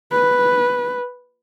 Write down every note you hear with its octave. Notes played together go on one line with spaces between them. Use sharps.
B4